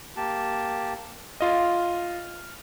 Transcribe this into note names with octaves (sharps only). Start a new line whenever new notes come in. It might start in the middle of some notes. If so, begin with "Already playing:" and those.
A#3 G4 A5
F4 D#5 F6